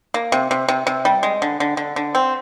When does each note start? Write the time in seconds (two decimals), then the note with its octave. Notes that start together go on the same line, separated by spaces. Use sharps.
0.14 A#3
0.32 C3
0.51 C3
0.68 C3
0.87 C3
1.05 G3
1.23 G#3
1.42 D3
1.60 D3
1.77 D3
1.96 D3
2.15 C4